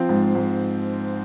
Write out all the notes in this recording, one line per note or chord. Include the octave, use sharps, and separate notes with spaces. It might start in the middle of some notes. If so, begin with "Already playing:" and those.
Already playing: F3 C4
G#2
G#2